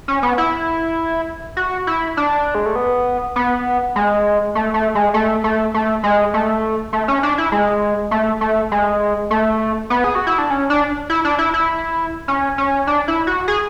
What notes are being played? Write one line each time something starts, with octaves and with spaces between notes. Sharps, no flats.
C#4
B3
E4
F#4
E4
D4
G#3
A3
B3
B3
G#3
A3
A3
G#3
A3
A3
A3
G#3
A3
A3
C#4
D4
E4
G#3
A3
A3
G#3
A3
B3
G#4
F#4
E4
D4
C#4
D4
E4
D4
E4
E4
C#4
C#4
D4
E4
F#4
G#4